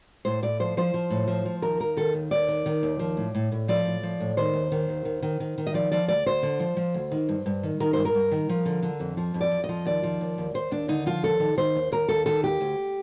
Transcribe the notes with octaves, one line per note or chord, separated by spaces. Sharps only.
A2 C5
A2 D5
F3 C5
F3 C5
F3
A2
F3
F3
D#2 A#4
D#2 A#4
D#3 A4
D#2
D#2 D5
D#3
D#3
D#2
F3
A2
A2
A2
F3 D5
A2
F3
A2
D#3 C5
D#2
D#3
D#2
D#3
D#3
D#3
D#3
D#5
F3 D5
F3 D5
D2 D5
D2 C5
D3
F3
F3
D2
D#3
G2
G2
D#3
D#3 A#4
G2 C5
A#4
G2
D#3
F3
D3
D3
F2
F3
F2
D5
F2
D#5
F3
D#2 D5
F3
D#2
D#2
D#2 C5
D#2 D4
D3 D#4
F3 F4
D#2 A4
D#3
D#3 C5
D#2
D#2 A#4
D#2 A4
D#3 A4
D#2 G4
D2